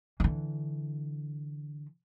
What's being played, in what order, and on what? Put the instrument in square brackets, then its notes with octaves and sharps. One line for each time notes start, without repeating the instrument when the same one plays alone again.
[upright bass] D3 E3